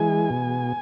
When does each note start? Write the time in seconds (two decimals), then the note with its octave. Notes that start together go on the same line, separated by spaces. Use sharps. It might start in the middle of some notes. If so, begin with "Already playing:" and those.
Already playing: E3 G#3 G#5
0.30 B2